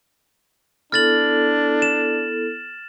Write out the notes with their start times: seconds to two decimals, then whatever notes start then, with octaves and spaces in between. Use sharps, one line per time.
0.92 B3 D4 E4 A4 F6 A6 F#7
1.82 E7